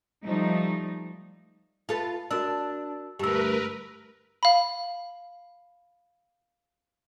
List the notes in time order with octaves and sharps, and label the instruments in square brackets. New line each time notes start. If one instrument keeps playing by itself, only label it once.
[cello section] F3 G3 A3 D#4
[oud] F4 A4 B4
[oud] D4 [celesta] F#4 A#4 E6
[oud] D2 G2 [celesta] G4 E6 [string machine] A#4 B4
[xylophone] F5 B5